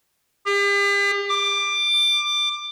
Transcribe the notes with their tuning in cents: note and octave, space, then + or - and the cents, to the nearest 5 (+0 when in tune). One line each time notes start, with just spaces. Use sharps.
G4 +40
D6 +15